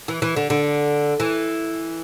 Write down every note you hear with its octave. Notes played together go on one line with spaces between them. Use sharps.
E3
E3
D3
D3
E3